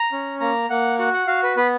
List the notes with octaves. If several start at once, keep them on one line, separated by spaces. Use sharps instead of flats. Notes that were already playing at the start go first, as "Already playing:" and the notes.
Already playing: A#5
C#4
A#3 A#5
A#3 F#5
F#4 F#5
F#5
F#4 F5
B4
B3 B4